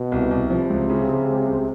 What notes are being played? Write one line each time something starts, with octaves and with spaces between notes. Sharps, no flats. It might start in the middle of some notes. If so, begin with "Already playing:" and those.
Already playing: B2
C2
C2
C3 F3
C#2
C#3
C#3
G#3
C#2